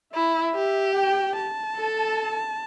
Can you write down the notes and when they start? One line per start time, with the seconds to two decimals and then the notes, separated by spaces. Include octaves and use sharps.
0.14 E4 E5
0.55 G4
0.95 G5
1.37 A5
1.76 A4